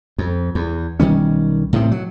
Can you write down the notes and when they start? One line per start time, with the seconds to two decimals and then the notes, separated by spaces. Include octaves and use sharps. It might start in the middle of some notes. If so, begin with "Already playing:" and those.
0.18 F2
0.55 E2
1.00 B1 D#3 G3 C#4
1.73 A2 C3 D#3
1.91 F#3